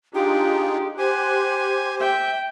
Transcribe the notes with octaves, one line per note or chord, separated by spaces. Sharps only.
D4 D#4 F4 G4 G#4
G4 C5 F#5 G#5
E5 G5